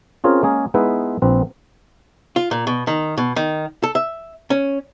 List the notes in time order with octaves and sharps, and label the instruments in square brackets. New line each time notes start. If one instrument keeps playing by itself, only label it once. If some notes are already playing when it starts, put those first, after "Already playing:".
[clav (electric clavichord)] C4 C#4 F4 G#4 A#4
G#3 A#3 C#4 G#4 A#4
G#3 B3 D#4 E4 B4 E5
A#1 C4 B4
[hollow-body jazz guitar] F4
A#2
B2
D#3
B2
D#3
A4
E5
C#4